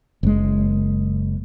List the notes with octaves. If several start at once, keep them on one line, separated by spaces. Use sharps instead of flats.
F#1 G#3